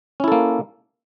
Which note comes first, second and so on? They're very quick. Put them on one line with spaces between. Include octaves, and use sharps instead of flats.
C#4 E4 A4 A#3